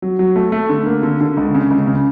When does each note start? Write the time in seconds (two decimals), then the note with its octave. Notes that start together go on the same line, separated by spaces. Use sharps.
0.02 F#3
0.19 F#3
0.36 A3
0.52 A3
0.70 D3
0.86 A#3
1.03 D3
1.21 D3
1.37 C#2
1.54 C#3
1.71 C#2
1.87 C#3